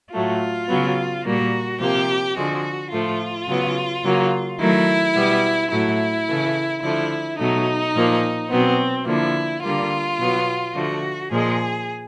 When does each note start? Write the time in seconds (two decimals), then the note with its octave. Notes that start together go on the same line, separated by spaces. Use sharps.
0.12 A2 F#3 A3 F4
0.67 C#3 F#3 B3
1.23 A#2 G3 A#3 F#4
1.79 C3 F3 A#3 G4
2.35 D3 F3 G#3 F#4
2.91 A2 F3 A3 F4
3.47 C#3 F#3 B3
4.03 C#3 F#3 A#3
4.59 D#3 F#3 A3 E4
5.15 B2 G3 B3
5.70 A2 F#3 A3 E4
6.28 C#3 E3 A3
6.82 D3 F3 A3 E4
7.38 B2 F#3 A3 D#4
7.94 A#2 F3 A#3
8.50 B2 F#3 B3 C4
9.06 D3 F3 A#3 E4
9.63 D3 G3 A#3 F4
10.19 B2 F#3 B3
10.74 D3 F3 A3 F#4
11.30 A#2 F3 G#3 G#4